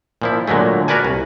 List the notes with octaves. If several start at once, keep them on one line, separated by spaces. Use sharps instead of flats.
A#2 F3 E4
A#2 D3 F#3 G#3 A3
F#4 A#4 B4 D5 F#5 G#5
C2